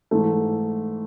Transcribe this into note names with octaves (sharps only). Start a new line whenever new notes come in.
G#2 E3 A3